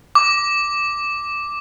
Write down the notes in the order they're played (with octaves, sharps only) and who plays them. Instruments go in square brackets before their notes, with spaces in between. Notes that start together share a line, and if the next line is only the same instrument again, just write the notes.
[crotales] D6